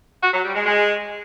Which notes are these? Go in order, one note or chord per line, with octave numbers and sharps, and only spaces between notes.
F#4
F#3
G3
G#3
G#3